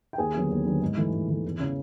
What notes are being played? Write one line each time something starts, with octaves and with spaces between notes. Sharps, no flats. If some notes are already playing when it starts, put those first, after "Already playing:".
G5
D#2 G#4 G#5
D3 F#3 B3
D#2
D3 F#3 B3
G#2
E3 A3
G#2
E3 A3
E2
C#3 E3